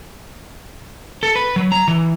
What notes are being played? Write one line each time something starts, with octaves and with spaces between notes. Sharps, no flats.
A4
B4
F#3
A#5
E3